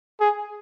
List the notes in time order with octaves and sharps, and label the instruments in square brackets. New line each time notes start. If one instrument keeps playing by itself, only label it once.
[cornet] G#4